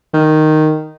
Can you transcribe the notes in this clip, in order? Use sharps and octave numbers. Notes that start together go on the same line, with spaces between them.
D#3